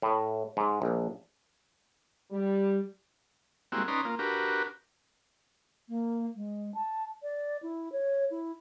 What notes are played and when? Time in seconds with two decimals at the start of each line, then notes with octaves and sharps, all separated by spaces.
0.02 A2
0.57 G#2
0.82 A#1
2.31 G3
3.72 G3 G#3 A#3 C4 E4 F#4
3.88 C#4 D#4 B4 D5 A#5 C6
4.05 A#3 F4
4.19 D4 F#4 G4 A#4 B4
5.88 A#3
6.35 G#3
6.74 A5
7.23 D5
7.62 E4
7.92 C#5
8.30 E4